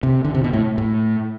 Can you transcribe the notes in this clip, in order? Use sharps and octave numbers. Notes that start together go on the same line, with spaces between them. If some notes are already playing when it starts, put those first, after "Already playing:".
C3
D3
C3
B2
A2
A2